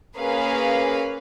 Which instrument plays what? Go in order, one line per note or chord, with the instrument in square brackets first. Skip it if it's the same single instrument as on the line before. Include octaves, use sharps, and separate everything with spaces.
[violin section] A#3 C#4 G#4 B4 F5